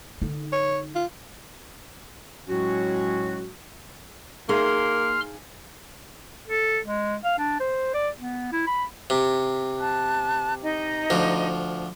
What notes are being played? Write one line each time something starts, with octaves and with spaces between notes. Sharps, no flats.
D3 D#4
C#5
F4
A2 F#3 G#3 C#4 F#4
A#3 D#4 G#4 F5 C6 F6
A4
G#3
F5
D4
C5
D5
B3
E4
B5
C3
A5 F#6
D#4 D#5 A#5
D2 F3